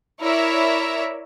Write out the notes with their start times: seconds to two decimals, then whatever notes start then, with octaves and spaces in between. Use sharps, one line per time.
0.20 E4 A#4 C#5 D5 E5